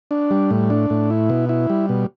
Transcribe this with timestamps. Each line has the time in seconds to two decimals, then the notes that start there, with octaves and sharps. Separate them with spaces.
0.11 D4
0.31 G3
0.50 A2
0.70 D4
0.90 A2
1.10 E4
1.30 B2
1.49 E4
1.70 G3
1.89 B2